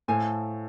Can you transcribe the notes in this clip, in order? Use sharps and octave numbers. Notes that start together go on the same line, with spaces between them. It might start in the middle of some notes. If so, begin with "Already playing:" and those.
A2 A4 C5 F5 G#5